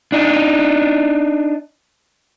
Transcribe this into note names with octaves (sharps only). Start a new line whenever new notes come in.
D4 D#4